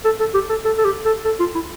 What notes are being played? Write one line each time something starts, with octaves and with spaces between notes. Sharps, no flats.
A4
A4
G4
A4
A4
A4
G4
A4
A4
F4
E4